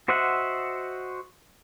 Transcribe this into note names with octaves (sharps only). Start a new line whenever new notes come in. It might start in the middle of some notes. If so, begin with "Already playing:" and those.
F#4 C5 D#5 E5 F#5